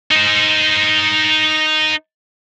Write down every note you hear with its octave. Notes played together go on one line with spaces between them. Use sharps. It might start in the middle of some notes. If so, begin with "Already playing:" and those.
D#4 C5